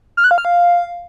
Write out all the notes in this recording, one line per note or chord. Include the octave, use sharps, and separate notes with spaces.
F6
F#6
F5
F6
F5